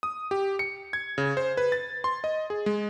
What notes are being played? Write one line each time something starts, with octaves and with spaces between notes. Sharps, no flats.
D#6
G4
C#7
G#6
C#3
C5
B4
A6
C6
D#5
G#4
G#3